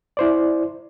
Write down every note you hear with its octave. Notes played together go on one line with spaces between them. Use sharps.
E4 C5 D5